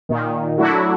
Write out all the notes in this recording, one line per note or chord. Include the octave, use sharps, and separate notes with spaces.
A#2 D#3
F#3 A3 D4 E4 F#4